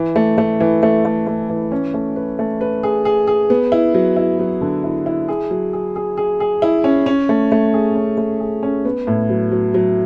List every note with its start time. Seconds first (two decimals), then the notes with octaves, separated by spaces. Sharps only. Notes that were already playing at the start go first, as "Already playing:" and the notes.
Already playing: E3
0.16 A3
0.38 A3
0.60 E3
0.83 A3
1.05 A3
1.27 A3
1.50 E3
1.72 C#4
1.94 A3
2.16 B4
2.39 A3
2.61 B4
2.83 G#4
3.05 G#4
3.27 G#4
3.50 B3
3.72 E4
3.94 F#3
4.17 E4
4.39 F#3
4.61 D3
4.84 E4
5.06 E4
5.28 G#4
5.51 F#3
5.73 G#4
5.96 G#4
6.17 G#4
6.40 G#4
6.62 E4
6.84 C#4
7.06 C#4
7.29 A3
7.52 A3
7.74 G#4
7.95 C#4
8.18 A3
8.40 G#4
8.63 C#4
8.85 B3
9.07 A2
9.30 F#3
9.52 F#3
9.74 F#3